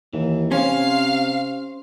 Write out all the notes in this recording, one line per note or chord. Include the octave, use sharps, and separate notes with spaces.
D#2 E3
C3 C#4 C5 F5